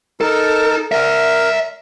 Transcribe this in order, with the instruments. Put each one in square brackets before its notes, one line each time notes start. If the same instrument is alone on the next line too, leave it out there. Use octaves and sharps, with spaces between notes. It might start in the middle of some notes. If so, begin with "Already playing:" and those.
[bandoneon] D#4 A#4 [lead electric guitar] A4
[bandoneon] A#4 [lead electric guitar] D5 E5